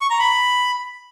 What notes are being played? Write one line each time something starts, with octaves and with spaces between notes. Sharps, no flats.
C#6
A#5
B5